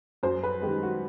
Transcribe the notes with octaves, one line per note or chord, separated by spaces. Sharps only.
F#2 C5
B4
D#3 G#3 G4
F#4